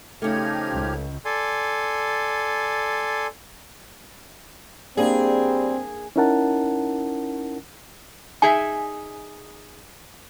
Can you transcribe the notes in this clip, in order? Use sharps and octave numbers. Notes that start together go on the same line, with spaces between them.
C#3 F3 A3 D#4 G4 F6 G#6
C#2
A4 D5 G#5 C6
G3 A#3 C4 D4 G#4
C#4 D#4 E4 A#4 F#5 A5
D#4 G#4 E5 G#5